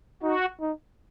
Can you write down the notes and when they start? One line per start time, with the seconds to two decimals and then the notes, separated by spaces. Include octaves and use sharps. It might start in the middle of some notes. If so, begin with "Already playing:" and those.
0.23 D#4 F#4
0.61 D#4